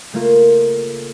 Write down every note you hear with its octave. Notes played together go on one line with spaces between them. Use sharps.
C#3 A3 A#3 F4